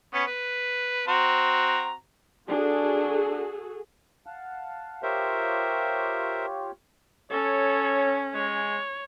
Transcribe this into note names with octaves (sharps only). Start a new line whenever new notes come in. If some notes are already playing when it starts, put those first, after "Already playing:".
B3 C#4
B4
C4 F#4 A#5
D4 F#4 G#4 A4
F5 F#5 A5
F4 G4 A#4 C5 C#5 E5
C#4 A4 C#5
G#3 C#5